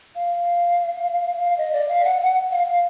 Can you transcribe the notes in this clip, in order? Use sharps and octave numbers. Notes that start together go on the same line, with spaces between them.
F5
F5
D#5
D5
F5
F#5
F#5
F5
F5